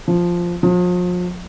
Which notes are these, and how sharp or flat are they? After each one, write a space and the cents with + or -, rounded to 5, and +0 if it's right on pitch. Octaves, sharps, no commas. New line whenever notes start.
F3 +0
F3 +40